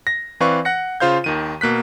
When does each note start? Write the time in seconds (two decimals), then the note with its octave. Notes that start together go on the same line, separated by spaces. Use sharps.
0.07 A#6
0.40 E3 C4 B4 D5 F5 C#6
0.65 F#5 F#6 A#6 C#7
1.00 C#3 F4 C5 F5 G6
1.24 D#2 D#3 D#7
1.61 B2 A#3 F#6 B6